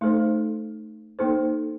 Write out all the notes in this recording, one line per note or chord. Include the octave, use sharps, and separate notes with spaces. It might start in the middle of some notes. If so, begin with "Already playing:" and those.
A3 D#4 A4 C5
A#3 D#4 A4 C5